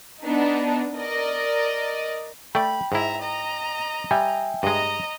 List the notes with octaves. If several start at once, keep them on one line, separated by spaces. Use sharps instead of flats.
B3 D4 D#4
A#4 D5 D#5
A3 D5 G5 B5
G#2 E4 E5 A#5
D#5 A#5
G3 E5 G5 G#5
G2 G#3 D#5 A#5